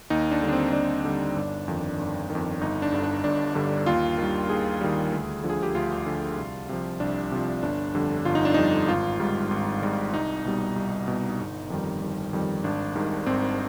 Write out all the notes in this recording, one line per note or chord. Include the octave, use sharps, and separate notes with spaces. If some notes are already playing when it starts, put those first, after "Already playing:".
D#2 D#4
D4
D3 G3
D4
C4
D#2 D4
D3 G3
G1
F2 D#3
G1
D#3
F2
G1 D#4
D4
G2 D3 G3
D4
G1 D4
G2 D3 G3
D#2 F4
D#3 G3
D#2 G#4
D#3 G3
D2
D3 F3
G#4
G4
D2 F4
D3 F3
C2
C3 F3
C2 D4
C3 F3
G1 D4
F2 D3 G3
G1 F4
D#4
D4
F2 D3 G3 D#4
G#1 F4
G#2 G3
G#1
G#2 G3
C2 D#4
B2 G3
C2
B2 G3
G1
F2 D#3 G3
G1
F2 D#3 G3
G#1 D4
G#2 D#3 G3
G#1 C4